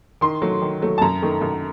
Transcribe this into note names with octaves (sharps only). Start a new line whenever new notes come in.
D#3 C6
F#3 A3
D#3
F#3 A3
A5
F#2 A#5
D#3 A3
F#2